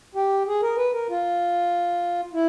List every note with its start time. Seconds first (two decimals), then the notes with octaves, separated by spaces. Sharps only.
0.15 G4
0.47 G#4
0.62 A#4
0.77 B4
0.93 A#4
1.09 F4
2.33 E4